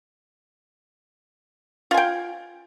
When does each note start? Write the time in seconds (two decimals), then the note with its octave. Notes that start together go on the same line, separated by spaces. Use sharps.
1.91 F4
1.94 G#5
1.97 G5